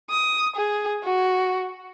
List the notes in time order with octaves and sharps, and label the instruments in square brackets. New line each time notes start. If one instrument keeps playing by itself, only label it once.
[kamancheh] D#6
G#4
F#4